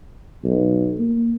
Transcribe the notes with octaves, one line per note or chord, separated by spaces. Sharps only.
B1
A#3